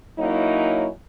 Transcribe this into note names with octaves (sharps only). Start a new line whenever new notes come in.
F#3 A#3 C#4 D#4 E4